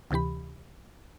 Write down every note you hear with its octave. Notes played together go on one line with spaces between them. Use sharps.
D2 C3 E3 G4 B5